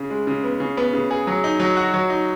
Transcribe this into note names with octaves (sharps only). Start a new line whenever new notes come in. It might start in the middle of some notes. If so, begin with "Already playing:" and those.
Already playing: C#3
G#3
C#3
B3
C#3
B3
C#3
G#4
F#3
D#4
F#3
F#4
F#3
D#4